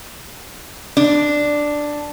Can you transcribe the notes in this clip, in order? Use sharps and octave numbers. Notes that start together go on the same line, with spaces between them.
D4